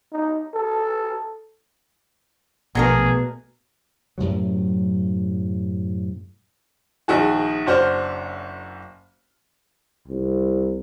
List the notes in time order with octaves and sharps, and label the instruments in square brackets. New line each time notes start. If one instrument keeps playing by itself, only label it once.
[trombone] D#4
A4
[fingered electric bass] A#1 [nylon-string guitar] B2 A3 B3 [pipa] F#3 D4 A#4 [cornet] G#4
[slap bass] F#2 A2 C3 F#3
[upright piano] A#1 D#3 F#4 G#4
F#1 D4 F#4 C5 F6
[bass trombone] C2